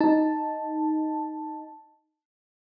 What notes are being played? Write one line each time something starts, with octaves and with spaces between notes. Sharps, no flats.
D#4 A5